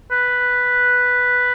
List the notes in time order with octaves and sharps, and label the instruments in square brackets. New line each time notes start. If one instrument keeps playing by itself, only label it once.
[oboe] B4